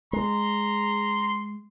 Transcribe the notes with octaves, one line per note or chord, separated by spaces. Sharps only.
G#3 A#5 C6